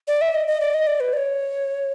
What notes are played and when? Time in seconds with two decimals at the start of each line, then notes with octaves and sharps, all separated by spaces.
0.08 D5
0.21 E5
0.35 D#5
0.48 D#5
0.60 D5
0.74 D#5
0.87 D5
1.00 B4
1.13 D5
1.17 C#5